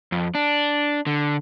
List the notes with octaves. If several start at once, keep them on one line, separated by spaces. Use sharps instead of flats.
F2
D4
D3